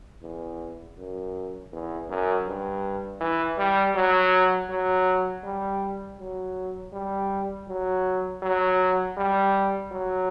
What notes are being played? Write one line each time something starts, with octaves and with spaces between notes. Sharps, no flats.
E2
F#2
E2
F#2
G2
E3
G3
F#3
F#3
G3
F#3
G3
F#3
F#3
G3
F#3